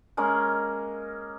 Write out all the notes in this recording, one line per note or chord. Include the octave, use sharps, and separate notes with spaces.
G#3 A#3 C#4